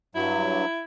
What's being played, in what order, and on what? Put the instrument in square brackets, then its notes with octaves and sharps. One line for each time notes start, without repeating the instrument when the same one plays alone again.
[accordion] G2 F#3 [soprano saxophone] E4